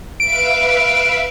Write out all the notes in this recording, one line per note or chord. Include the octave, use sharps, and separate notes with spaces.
B4 E5 F5 D7